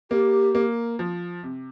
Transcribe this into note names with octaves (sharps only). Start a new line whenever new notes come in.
A#3 G4
A#3
F3
C3